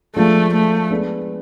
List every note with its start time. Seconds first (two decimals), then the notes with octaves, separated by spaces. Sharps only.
0.16 F3 G#3 A3 D4 F4
0.54 A3
0.90 G#3 B3 D4